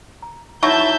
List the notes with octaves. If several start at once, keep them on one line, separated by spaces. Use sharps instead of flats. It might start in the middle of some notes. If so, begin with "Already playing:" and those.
A#5
B2 F#3 D#4 E4 E5 A5 C#6 G6